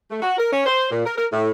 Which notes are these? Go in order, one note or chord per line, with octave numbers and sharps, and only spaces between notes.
A3
F#4
A#4
C#4
C5
A#2
A#4
A#4
A2